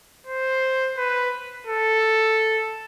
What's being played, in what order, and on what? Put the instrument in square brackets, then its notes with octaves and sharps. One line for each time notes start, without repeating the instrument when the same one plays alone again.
[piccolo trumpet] C5
B4
A4